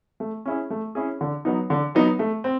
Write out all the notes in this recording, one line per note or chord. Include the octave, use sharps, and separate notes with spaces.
A3
C#4 E4 G#4
A3
C#4 E4 G#4
D3
F#3 B3 D#4
D3
F#3 B3 D#4
A3
C4